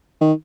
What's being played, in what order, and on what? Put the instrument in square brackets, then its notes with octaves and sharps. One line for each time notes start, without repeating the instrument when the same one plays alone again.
[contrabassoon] D#3